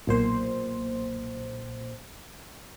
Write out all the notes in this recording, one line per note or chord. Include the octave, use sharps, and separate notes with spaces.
B1 A#2 C5